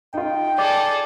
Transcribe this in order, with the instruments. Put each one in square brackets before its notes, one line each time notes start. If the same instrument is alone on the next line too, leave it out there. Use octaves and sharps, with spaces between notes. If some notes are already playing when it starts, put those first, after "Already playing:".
[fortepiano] D#4 F4 [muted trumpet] G5
[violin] G#4 A4 [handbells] D5 D6 A6